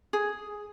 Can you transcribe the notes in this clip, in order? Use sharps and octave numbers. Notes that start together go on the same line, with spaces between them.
G#4